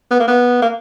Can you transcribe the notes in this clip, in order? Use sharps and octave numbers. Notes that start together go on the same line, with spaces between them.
B3
A#3
B3
A#3